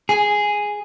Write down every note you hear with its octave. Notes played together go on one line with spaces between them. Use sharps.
G#4